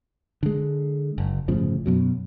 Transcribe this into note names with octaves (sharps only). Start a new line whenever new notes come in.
D3 G#3
F#1
G1 A2 C#3 F3
F#2 B2 F#3